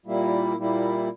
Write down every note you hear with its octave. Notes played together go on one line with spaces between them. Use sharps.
A#2 G3 A#3 E4
A#2 G3 A#3 E4